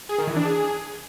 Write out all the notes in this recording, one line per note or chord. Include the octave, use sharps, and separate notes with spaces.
G#4
D#3
E3
D4
G#4